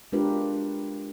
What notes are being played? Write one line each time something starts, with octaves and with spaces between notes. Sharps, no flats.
G#3 D4 F4 G4 A#4 B4